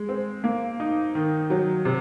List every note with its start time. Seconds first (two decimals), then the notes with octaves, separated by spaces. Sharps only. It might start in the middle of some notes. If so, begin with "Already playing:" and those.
Already playing: G#3
0.09 C4
0.44 A#3
0.80 D#4
1.15 D#3
1.50 F#3
1.85 C3